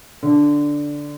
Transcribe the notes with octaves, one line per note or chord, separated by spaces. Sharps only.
D3